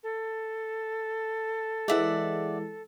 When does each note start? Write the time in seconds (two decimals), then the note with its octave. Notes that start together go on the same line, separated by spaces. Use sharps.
0.03 A4
1.88 E3 G#3 D5 E5 F#5